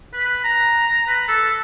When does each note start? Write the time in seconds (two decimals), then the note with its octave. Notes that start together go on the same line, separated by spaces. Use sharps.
0.13 B4
0.44 A#5
1.07 B4
1.28 A4